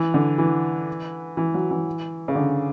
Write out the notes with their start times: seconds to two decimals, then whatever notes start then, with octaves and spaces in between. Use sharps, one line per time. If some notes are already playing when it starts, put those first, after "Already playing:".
Already playing: E3
0.14 D3
0.38 E3
1.37 E3
1.54 F#3
1.71 E3
2.28 C#3
2.35 D3